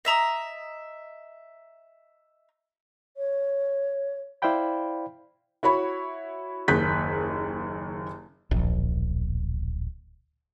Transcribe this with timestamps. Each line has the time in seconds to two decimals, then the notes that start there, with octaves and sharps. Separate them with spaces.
0.05 D#5 E5 A#5 D#6
3.17 C#5
4.42 E4 C5 D5 F5 G5 B5
5.63 E4 F#4 C#5 B5
6.68 F#1 D#2 G#4 F#6 G6 B6
8.51 D1 A#1